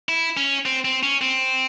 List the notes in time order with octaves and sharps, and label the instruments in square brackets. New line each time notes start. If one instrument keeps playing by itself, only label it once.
[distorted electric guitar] E4
C#4
C4
C4
C#4
C4